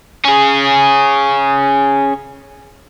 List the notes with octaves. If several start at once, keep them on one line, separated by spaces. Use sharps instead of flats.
C#4 G#4